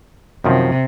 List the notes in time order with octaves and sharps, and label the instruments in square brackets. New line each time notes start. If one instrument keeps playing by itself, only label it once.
[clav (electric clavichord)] F#2 D#3 F3 [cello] C3